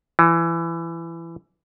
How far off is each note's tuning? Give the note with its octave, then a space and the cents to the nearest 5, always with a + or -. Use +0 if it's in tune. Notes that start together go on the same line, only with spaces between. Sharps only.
E3 +20